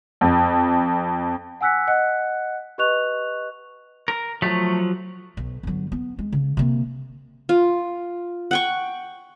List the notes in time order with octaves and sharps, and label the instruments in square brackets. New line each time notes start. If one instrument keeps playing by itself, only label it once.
[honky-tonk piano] F2
[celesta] F#5 G#5 E6 F#6 B6 C#7
D#5 F#5 F#6 C#7
G4 B4 D#5 C#6 F#6 F7
[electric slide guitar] A#4
[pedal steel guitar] F3 F#3 [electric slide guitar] A3
[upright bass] B1
G1 F#3
B3
G#3
C#3
C3 A#3
[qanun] F4
F#5 G5 C#6